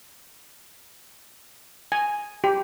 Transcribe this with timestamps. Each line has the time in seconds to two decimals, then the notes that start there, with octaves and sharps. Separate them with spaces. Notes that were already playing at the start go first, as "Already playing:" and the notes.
1.92 G#5
2.44 G4